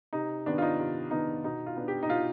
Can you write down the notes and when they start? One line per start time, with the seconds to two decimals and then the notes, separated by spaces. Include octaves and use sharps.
0.13 C3 D#4
0.46 D#3 B3 D4
0.58 F4
0.62 D#4
0.79 C3 F4
1.11 D#3 B3 D4 D#4
1.44 B2 D#4
1.66 F4
1.77 B3 D4
1.88 G4
2.03 D#4
2.09 B2 F4